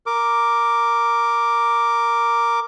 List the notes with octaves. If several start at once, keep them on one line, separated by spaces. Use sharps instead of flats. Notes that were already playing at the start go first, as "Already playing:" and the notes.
A#4 D6